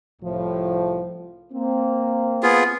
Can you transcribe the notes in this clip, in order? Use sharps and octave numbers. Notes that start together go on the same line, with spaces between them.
C2 A2 F3
A#3 C4
B3 F4 G#4